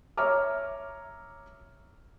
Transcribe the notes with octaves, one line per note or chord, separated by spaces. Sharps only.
C#5 E5 A#5 D6 F6